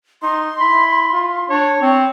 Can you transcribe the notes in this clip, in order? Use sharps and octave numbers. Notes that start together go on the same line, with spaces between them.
D#4 C6
E4 B5
F4
D4 C#5
C4 C#5